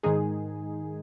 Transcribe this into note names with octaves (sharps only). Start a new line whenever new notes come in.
G#2 D#3 G#3 D#4 G#4